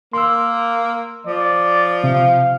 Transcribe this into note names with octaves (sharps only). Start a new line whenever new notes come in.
A#3 A#4 C6 E6
F3 D5
C3 F5